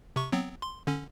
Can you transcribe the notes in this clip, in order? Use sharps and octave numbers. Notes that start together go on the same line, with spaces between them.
C3 C#6
F#3 B3 C4
C6
D3 C#4